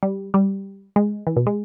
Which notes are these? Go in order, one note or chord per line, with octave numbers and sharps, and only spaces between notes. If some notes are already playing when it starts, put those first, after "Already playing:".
G3
G3
G#3
E3
B2
G#3